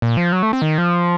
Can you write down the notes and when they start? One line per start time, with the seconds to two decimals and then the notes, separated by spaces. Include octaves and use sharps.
0.02 A#2
0.17 F3
0.32 F#3
0.43 A3
0.53 C4
0.62 D#3
0.78 F3